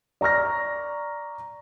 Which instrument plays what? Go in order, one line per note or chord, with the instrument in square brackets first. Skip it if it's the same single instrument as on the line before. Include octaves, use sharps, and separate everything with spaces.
[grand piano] D5 A#5 C#6 F6 A#6